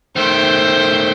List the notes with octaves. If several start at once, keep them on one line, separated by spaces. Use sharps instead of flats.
D#3 A3 C5 G5